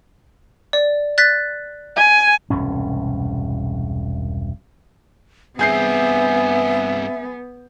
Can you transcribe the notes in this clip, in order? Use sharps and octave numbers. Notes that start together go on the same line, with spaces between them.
D5
F#6 A6 B6
G#5
E1 C2 G2 C#4
G2 B3 C4 G#4 E5 G6 C7